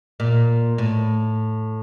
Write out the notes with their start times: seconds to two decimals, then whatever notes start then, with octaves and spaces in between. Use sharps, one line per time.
0.20 A#2
0.78 A2